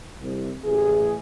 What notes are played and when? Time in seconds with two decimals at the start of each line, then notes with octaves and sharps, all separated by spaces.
0.20 C2
0.64 A1 E3 G#4